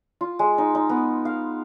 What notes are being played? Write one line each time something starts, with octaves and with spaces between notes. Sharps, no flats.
F4
G#3
D#4
D#4
B3
F5